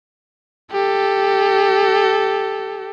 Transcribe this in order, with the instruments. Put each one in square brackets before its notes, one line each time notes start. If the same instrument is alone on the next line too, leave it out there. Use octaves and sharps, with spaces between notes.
[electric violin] G4 A4